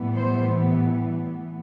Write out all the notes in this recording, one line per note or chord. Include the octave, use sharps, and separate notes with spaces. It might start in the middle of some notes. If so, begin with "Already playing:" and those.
Already playing: A2 E3 G3 B3
C5